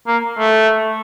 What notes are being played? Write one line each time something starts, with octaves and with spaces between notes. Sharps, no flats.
A#3
A3